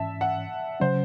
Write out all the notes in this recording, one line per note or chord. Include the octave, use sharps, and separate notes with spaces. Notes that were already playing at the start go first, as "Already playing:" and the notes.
Already playing: G#2 E3 C#4 E5 A5
F#5
C#3 F#3 C#4 C5